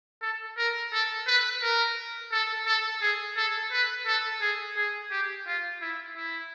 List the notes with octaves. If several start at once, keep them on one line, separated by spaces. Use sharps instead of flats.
A4
A#4
A4
B4
A#4
A4
A4
G#4
A4
B4
A4
G#4
G#4
G4
F4
E4
E4